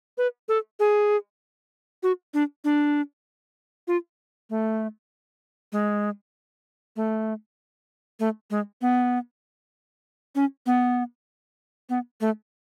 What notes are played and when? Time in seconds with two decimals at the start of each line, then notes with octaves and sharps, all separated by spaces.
0.18 B4
0.49 A4
0.80 G#4
2.03 F#4
2.34 D4
2.64 D4
3.88 F4
4.50 A3
5.72 G#3
6.96 A3
8.20 A3
8.50 G#3
8.81 B3
10.35 C#4
10.66 B3
11.89 B3
12.21 A3